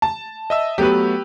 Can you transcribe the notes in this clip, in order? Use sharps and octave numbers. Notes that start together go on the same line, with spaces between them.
A5
D#5 E5 E6
F#3 A3 B3 G4 B4